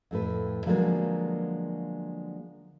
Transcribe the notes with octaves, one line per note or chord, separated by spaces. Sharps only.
F2 A2 B4
D3 F3 F#3 G#3 A#3 B3